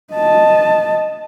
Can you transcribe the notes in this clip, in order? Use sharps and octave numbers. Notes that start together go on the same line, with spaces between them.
D#5 A5